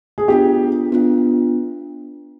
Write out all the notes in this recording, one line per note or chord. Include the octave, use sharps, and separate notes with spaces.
G#4
B3 D4 F4 G4
B3 D4 F4